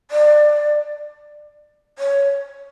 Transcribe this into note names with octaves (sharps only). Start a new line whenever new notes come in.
D5
C#5